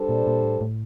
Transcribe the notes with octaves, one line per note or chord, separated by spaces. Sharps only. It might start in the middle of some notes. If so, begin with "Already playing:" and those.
Already playing: G3 D4 A4 C5
A#2
A#2
A2
A2